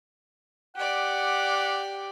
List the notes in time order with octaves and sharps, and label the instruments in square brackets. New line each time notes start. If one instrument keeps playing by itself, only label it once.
[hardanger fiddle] G4 D5 [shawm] F#5